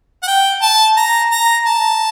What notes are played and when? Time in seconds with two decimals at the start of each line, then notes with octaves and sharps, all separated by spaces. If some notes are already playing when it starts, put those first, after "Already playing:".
0.23 F#5
0.27 G5
0.62 A5
0.97 A#5
1.31 A#5
1.66 A5